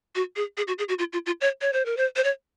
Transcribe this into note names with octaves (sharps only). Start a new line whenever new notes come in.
F#4
G#4
G#4
F#4
G#4
F#4
F4
F4
F4
C#5
C#5
C5
A#4
C5
C5
C#5